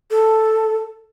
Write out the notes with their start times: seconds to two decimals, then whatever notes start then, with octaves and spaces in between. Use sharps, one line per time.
0.11 A4